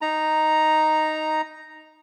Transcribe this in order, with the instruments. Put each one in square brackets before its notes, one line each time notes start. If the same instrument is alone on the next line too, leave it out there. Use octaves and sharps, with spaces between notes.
[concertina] D#4 A#5